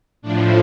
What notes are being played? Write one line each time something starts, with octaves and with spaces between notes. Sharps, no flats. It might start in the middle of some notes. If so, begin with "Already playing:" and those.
A2 F3 D4